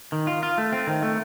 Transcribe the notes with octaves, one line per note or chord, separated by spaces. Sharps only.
D#3
F4
F4
A3
C4
D#3
A3